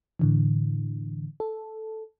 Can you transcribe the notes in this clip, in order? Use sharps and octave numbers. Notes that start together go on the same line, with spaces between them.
A2 D3 E3
A4